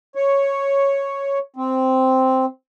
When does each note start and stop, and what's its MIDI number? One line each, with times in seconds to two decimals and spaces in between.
0.15 1.39 73
1.56 2.45 60